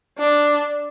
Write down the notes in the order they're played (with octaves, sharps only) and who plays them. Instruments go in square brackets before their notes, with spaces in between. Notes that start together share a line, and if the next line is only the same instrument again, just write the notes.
[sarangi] D4